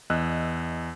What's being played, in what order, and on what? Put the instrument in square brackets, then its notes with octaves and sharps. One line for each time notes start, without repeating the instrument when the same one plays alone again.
[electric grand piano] E2 D#5 E6 F#6